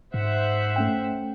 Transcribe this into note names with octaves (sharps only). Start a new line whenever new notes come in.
G#2 C5 E5 F#5
A3 C#4 G5